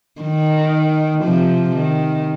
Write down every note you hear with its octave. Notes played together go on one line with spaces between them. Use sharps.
D#3
C3 F3
D#3